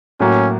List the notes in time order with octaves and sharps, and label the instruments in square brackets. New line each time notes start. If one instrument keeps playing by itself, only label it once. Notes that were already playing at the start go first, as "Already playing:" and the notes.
[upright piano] A2 F#3 A#3 [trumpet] C#4